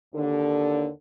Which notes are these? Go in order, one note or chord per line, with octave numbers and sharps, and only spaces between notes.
D#2 D3